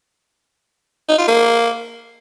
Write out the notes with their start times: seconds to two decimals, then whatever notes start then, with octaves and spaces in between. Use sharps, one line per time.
1.09 D#4
1.18 F4
1.28 A#3